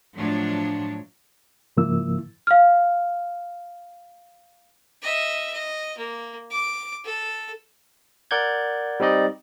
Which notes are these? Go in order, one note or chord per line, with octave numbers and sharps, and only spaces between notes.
A2 F3 F#3 D4 C#5
G#2 C#3 F3 A#3 E4 E6
F5 F6
D#5 E5
D#5
A#3
D6
A4
A#4 D5 F#5 G6 G#6
G3 C4 D#4 D5 D#5